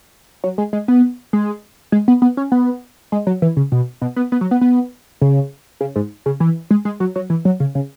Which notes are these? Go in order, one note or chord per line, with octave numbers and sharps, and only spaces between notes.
F#3
G#3
G#3
B3
G#3
G#3
B3
B3
C#4
B3
G#3
F#3
E3
C#3
B2
B2
B3
B3
F#3
B3
B3
C#3
C#3
G#2
C#3
E3
G#3
G#3
F#3
F#3
E3
F#3
C#3
C#3